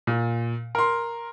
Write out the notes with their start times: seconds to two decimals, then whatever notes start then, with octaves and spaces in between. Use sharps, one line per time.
0.07 A#2
0.75 A#4 C6